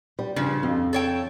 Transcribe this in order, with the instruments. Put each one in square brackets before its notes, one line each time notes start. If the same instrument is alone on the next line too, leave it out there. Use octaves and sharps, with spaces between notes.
[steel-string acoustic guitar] G3
[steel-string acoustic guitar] G2 [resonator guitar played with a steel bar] C#3 F3
[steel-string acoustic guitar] F2
[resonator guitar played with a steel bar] A4 C#5 G5